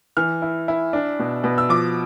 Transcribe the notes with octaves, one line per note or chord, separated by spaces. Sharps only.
E3 F6
E4
E4
D4
B2
B2
E6
F3 D6